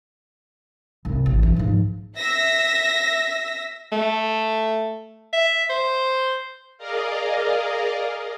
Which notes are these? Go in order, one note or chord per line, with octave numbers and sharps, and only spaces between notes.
C2
A1
E3
G#2 F3
E5 E6 A#6 B6
A3
E5
C5
G#4 A#4 D5 D#5 F5